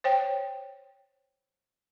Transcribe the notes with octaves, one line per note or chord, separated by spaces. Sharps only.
C5 C#5 G5